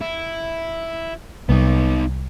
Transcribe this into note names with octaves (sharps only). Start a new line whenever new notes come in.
E4
C2 B3 D#4